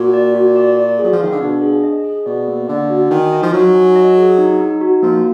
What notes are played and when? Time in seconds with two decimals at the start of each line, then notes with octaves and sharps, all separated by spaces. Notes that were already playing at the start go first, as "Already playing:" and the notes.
Already playing: A#2 F#4
0.14 D5
0.35 F#4
0.56 D5
0.77 D5
0.99 F#3 G#4
1.13 F3
1.20 D#3 F5
1.32 D3
1.41 B2 D4
1.62 G#4
1.84 D#5
2.04 G#4
2.26 B2 D5
2.48 A#3
2.68 D3 D5
2.90 F#4
3.11 D#3 G#5
3.32 D#5
3.43 F3
3.53 F#3 D#4
3.75 G#5
3.96 D#5
4.17 G#4
4.38 D#4
4.60 D#4
4.81 F#4
5.02 F3 A#3